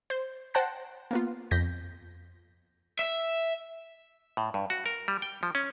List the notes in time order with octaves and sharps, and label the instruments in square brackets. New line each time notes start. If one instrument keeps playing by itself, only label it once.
[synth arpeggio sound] C5 G6
C5 F#5 G5 A5 F#6 A#6
A#3 B3 F4
F2 G6 A#6 B6
[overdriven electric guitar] E5
[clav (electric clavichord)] A2
G2
F#4
A#4
G3
G5
F3
C#4